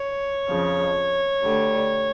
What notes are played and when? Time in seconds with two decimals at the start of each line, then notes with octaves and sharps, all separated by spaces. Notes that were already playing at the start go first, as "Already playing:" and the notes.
Already playing: C#5
0.47 F2 C#3 F3
1.42 D2 D3 G3